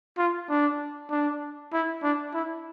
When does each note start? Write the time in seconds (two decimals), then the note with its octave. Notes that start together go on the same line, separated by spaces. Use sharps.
0.18 F4
0.49 D4
1.10 D4
1.72 E4
2.03 D4
2.34 E4